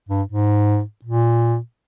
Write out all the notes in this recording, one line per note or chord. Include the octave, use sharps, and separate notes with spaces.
G2
G#2
A#2